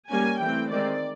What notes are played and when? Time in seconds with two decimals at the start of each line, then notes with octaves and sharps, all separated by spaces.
0.11 G3 A#3 C#4 G#5
0.41 E3 A3 C4 G5
0.72 D#3 G#3 C4 D5